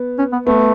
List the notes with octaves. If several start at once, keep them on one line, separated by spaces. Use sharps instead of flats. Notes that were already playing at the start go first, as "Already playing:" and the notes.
Already playing: B3
C#4
B3
A3 B3